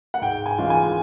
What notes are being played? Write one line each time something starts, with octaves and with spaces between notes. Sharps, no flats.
F#5
G#2 G5
G#5
E3 G#3 C#4 F4
G#5